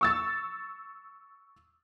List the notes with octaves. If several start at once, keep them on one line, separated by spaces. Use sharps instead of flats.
C#6 E6 A6